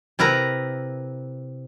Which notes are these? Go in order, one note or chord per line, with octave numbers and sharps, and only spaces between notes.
C3 E4 A#4 B4 A#5